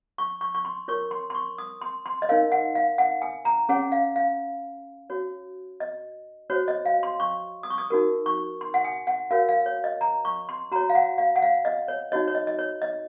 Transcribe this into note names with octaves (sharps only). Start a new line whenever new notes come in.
C#6
C#6
C#6
C6
F4 A#4 C#5 C#6
C6
C6
C#6
D#6
C6
C6
D#5
D#4 A#4 C#5 F5
F#5
F5
F#5
G#5
A#5
C#4 G#4 C#5 F#5
F5
F5
F#4 C#5
D#5
F#4 C5 C#5
D#5
F5
C6
C#6
D#6
C#6
D#6
D#4 F#4 A#4
C#6
C6
F#5
G#5
F#5
F#4 A#4 C#5 F5
F5
C#5
D#5
A#5
C#6
C6
F#4 C#5 A#5
F5
F#5
F5
F#5
F5
D#5
C#5
D#4 F#4 C#5 D#5
C#5
D#5
D#5
C#5
D#5